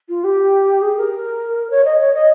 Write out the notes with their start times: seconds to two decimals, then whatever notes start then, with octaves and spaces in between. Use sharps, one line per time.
0.09 F4
0.24 G4
0.82 G#4
0.97 A#4
1.70 C#5
1.85 D#5
2.00 C#5
2.14 D#5